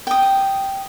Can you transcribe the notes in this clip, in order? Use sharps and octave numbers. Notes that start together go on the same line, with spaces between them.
G5 D#6